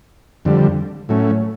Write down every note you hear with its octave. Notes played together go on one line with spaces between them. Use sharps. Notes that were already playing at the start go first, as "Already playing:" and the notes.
F2 D3 G3
A2 F#3 A3 C#4